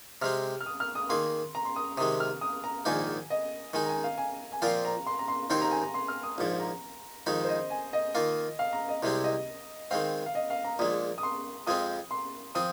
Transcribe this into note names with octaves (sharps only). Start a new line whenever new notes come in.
C3 G#3 C4 F6
F6
D#6
F6
D#6
D#3 A#3 G#4 C6
A#5
C6
D#6
C3 D#3 G#3 D#6
F6
D#6
A#5
A#1 G#2 D#3 A#3 D#4 G#5
D#5
D#3 G#3 D#4 G#5
A#5
G#5
F5
G#5
G#5
A#2 F3 C4 F4 A#4 F5
A#5
C6
A#5
C6
D#2 D#3 C4 D#4 A#4 C6
A#5
G#5
A#5
C6
F6
D#6
A#1 G#2 F3
A#5
F2 D#3 G#3 D#4
C5
D#5
G#5
D#5
D#3 A#3 F4
F5
A#5
D#5
C2 C3 G#3 C4
D#5
D#3 G#3 C4 F5
F5
D#5
F5
A#5
A#1 A#2 G#3 D#6
D#6
C6
F2 F3 G#3 C4 D#6
C6
F3 C4 D#6